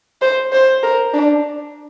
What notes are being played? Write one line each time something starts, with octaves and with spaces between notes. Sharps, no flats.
C5
C5
A#4
D4